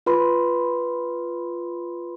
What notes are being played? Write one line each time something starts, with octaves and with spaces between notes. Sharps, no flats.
F4 B4 B5 C6